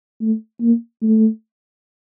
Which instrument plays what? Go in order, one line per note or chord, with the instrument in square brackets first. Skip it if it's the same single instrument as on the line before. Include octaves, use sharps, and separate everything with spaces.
[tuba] A3
A#3
A3